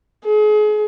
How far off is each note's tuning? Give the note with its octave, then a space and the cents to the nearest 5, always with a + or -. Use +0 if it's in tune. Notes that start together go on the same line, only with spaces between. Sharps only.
G#4 +35